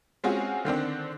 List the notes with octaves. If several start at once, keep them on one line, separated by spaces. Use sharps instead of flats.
G#3 C4 C#4 F4 F#4 G#4
D3 D#3 C4 D4